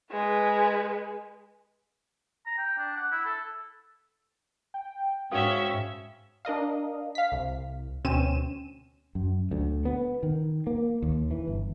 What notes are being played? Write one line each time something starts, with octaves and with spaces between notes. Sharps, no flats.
G#3 B4
A#5
G5
D4
F#5
E4
A4
G5
G#2 C#4 F#4 E5 F5 D#6
D4 A#4 D#5 F5
F5 B6
C2
D2 B2 C4 C#4 D#7 E7
F#2
D2
B3
D#3
A#3
D#2
E3
G1